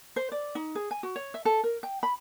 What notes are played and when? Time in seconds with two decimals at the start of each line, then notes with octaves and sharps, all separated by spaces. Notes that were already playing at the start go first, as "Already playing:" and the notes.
0.16 C5
0.32 D5
0.55 D#4
0.75 G#4
0.91 G#5
1.03 F#4
1.16 C#5
1.34 E5
1.45 A4
1.64 A#4
1.83 G5
2.03 B5